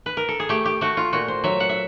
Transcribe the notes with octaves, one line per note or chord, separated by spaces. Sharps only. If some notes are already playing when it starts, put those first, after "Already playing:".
B4
A#4
A4
G#4
A3 G4
G4
A3 F#4
F4
A#2 F#4
C5
F#3 E5
F#5
E5